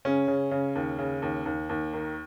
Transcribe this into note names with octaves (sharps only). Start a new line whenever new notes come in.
C#3 C#4
C#3
C#3
D#2
C#3
D#2
D#2
D#2
D#3